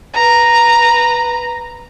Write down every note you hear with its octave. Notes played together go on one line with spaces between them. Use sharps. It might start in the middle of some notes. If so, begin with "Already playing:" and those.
B4 A#5